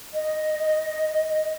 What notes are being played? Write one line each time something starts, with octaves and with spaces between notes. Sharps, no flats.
D#5